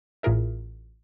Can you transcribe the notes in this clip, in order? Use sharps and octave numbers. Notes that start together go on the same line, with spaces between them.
A1 A2 F4 G#4 A#4 E5